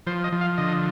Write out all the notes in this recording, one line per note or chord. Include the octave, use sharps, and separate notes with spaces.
F3 C5
D#5
F3
F5
D3 D#5